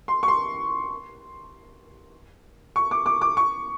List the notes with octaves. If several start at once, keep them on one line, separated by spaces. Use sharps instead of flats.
C6
C#6
C6
C#6
D6
D6
D6
C#6